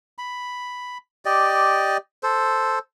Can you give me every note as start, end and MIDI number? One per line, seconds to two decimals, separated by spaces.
0.18 0.98 83
1.25 1.97 67
1.25 1.97 74
1.25 1.97 75
2.23 2.79 69
2.23 2.79 72